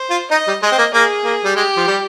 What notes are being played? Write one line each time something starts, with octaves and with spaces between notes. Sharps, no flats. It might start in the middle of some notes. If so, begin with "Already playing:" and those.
Already playing: C5
F4
D#4 D#5
G3
G#3 D#5
C4
A#3
A#3 G#4
A#3
G3
G#3 G4
F3
G3